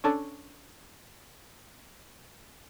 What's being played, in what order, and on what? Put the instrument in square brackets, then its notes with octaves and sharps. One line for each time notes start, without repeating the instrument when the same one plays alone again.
[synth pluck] C#4 D4 A4